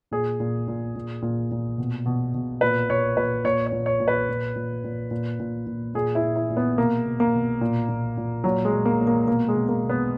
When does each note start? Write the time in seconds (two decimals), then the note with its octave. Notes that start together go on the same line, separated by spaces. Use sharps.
0.11 A#2 G#4
0.40 A#2
0.68 A#2
0.96 A#2
1.22 A#2
1.51 A#2
1.78 B2
2.06 B2
2.34 B2
2.61 A#2 B4
2.89 A#2 C#5
3.17 A#2 B4
3.44 A#2 C#5
3.66 C#5
3.72 A#2
3.86 C#5
4.00 A#2
4.08 B4
4.29 A#2
4.56 A#2
4.84 A#2
5.11 A#2
5.40 A#2
5.67 A#2
5.95 A#2 G#4
6.15 E4
6.23 A#2
6.36 E4
6.50 A#2
6.57 B3
6.78 B2 A#3
7.06 B2
7.20 A#3
7.34 B2
7.61 A#2
7.89 A#2
8.17 A#2
8.44 A#2 F#3
8.65 G#3
8.72 A#2
8.85 A#3
9.00 A#2
9.07 A#3
9.27 B2 A#3
9.48 G#3
9.55 B2
9.69 A#3
9.83 B2
9.89 B3